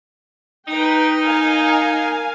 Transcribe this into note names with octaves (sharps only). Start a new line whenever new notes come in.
D#4 B4 G5
A#4 F5 G#5